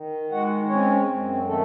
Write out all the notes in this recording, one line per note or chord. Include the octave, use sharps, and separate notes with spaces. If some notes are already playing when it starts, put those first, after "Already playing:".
Already playing: D#3
G#3 F#4 F#5
C4 C#4 C#5
F#2
D#3 A3 A4